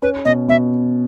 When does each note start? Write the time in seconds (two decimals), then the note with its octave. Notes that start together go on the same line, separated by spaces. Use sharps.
0.02 C#4 B4
0.25 B2 D#5
0.48 B2 E5